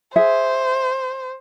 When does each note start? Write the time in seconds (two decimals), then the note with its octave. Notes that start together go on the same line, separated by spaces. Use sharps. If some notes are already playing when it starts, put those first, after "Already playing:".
0.16 G#4 C5 E5